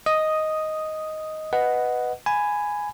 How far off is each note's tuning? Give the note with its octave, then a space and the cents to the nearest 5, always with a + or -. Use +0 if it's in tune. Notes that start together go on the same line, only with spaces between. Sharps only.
D#5 +5 D#6 +0
B4 +5 D#5 +0 F#5 +0
G#5 +0 B5 +10